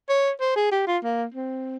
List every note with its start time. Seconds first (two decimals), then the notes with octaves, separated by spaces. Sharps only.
0.09 C#5
0.41 C5
0.56 G#4
0.72 G4
0.87 F4
1.03 A#3
1.34 C4